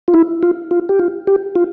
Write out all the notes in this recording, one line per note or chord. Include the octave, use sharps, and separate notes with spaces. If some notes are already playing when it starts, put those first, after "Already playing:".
F4
E4
F4
F4
G4
F4
G4
F4